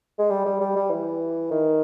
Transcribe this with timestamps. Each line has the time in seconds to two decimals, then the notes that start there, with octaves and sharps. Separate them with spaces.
0.19 G#3
0.30 G3
0.46 G3
0.61 G3
0.76 G3
0.90 E3
1.51 D#3